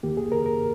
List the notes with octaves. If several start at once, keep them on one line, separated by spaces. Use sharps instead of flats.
D#2 D#3 A#3 G4
G#4
A#4
A#4